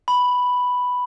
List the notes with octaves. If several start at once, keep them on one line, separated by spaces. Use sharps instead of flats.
B5